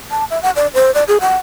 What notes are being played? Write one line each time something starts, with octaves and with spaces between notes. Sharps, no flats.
A5
E5
F#5
D5
C5
D5
G#4
F#5